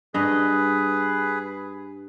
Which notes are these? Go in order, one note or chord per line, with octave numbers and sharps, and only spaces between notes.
G2 G#4 B4 D#5